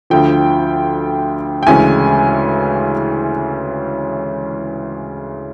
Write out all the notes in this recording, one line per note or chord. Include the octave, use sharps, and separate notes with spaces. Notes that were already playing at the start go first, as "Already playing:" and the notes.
D2 D3 F3 G5
G5
D2 C#3 E3 G#3 C#4 G#5